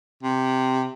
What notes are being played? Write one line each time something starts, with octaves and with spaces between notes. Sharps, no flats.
C3